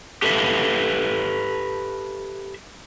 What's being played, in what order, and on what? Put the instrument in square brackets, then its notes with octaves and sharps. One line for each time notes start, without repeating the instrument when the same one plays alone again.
[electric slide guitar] G4 A4 B4 D5 E5 F5